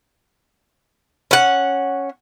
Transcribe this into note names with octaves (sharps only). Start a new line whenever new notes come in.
C#4 F#5